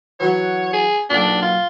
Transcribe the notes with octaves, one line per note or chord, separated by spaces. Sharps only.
E3 F#3 F#4 C#5
G#4
B1 A#2 D4
F4